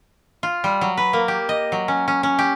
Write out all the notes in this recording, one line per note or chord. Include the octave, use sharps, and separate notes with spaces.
F4
G3
F#3
B4
A#3
G4
D#5
F#3
C#4
C#4
C#4
G4